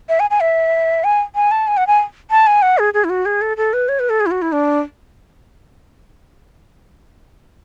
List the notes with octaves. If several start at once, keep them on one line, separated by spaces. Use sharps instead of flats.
E5
G#5
G#5
E5
G#5
G#5
A5
G#5
F#5
G#5
A5
G#5
F#5
G#4
G#4
E4
F#4
G#4
A4
A4
B4
C#5
B4
A4
G#4
E4
F#4
E4
D4